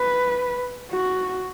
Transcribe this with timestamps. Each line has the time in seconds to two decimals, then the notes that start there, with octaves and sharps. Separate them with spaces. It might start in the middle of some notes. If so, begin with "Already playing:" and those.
Already playing: B4
0.91 F#4